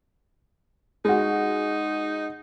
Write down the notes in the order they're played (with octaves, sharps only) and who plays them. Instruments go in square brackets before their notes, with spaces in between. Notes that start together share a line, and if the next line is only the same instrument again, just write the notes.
[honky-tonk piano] G#3 F#4 [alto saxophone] D#4